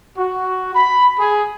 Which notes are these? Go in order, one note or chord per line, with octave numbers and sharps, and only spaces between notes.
F#4
B5
G#4